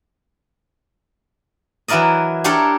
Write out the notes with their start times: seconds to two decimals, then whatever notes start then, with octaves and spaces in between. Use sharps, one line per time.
1.88 E3 F#3 E4 A#4 D5 D#5
2.44 D4 G4 A4 A#4 C#5 G5